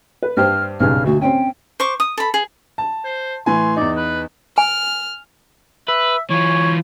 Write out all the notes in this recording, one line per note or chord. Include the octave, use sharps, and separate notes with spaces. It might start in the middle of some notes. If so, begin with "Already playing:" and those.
B4
G2 G4 C5 F6
B1 G2 C#3 F6
D2 F#4
C4 C#4 G5
C5 C#6 D6
D#6
A4 B5
G#4
A5
C5
A2 E3 G#5 C6
E2 D#4 D5
B4
G#5 F6
B4 E5
E3 F4 C#5